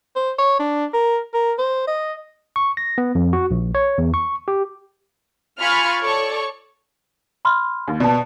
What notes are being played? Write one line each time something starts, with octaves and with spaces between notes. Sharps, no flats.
C5
C#5
D4
A#4
A#4
C5
D#5
C#6
A#6
B3
F2
F#4
A#1
C#5
E2
C#6
G4
F4 G#5 B5 C#6 F6 A6
A4 C#5 D5 C#6
B5 C6 F6
D#2
B2 D5 A5